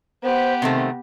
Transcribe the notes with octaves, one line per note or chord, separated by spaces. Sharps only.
B3 G4 C5
C3 D#3 A3 C4